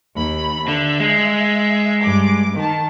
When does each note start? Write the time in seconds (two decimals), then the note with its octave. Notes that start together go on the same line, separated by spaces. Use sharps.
0.16 D#2 B5
0.68 D3 E5
1.00 G#3
2.01 G2 D6
2.54 D#3 A5